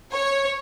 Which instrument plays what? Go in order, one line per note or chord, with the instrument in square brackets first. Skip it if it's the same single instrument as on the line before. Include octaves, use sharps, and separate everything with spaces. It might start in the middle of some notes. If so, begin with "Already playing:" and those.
[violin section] C#5